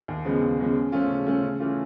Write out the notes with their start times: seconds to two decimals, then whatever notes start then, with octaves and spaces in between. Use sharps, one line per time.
0.08 D#2
0.25 C#3 F3 G#3 B3
0.42 D#2
0.59 C#3 F3 G#3 B3
0.76 C#3
0.92 F3 A3 C#4 F4
1.10 C#3
1.27 F3 A3 C#4 F4
1.43 C#3
1.60 E3 A3 C#4 F4